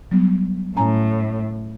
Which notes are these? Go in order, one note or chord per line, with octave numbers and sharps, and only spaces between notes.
F#3 G3 B3
A2 C#4 G#5 A#5